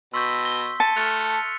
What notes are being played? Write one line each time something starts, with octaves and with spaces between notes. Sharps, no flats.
B2 C6 C#6 E6 G6 B6
A#6 G7
A5 C#7 D#7
A3 F6 F#6 A6 C#7 F7
A6